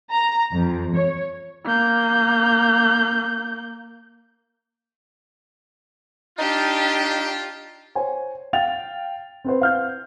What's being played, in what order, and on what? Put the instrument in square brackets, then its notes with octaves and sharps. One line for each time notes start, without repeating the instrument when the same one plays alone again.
[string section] A#5
F2
C#5
[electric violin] A#3 G6
[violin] D4 G4 [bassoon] D#4 [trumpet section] F4
[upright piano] C5 C#5 G#5
F5 G5 A6 F7
C4 B4 C5
F5 F6 G6